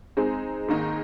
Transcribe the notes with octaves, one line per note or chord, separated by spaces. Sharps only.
G#3 C4 D#4 G#4
G#2 D#3 A#3 D#4